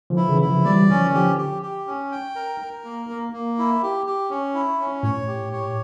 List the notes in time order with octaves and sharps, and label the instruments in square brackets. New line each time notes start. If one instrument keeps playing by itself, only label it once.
[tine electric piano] D3 F3
[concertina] E4
[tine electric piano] C#3 E3
[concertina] E4
[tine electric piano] D3 F3
[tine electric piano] E3 G3 [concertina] D5
[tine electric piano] D3 F3 [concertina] C#4
[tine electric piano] D3 F3 [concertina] G4
[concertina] G4
G4
C#4
G5
A#4
A#4
A#3
A#3
A#3
E4
G4
G4
C#4
E4
C#4
[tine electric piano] A2 [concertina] C#5
[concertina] G4
C#5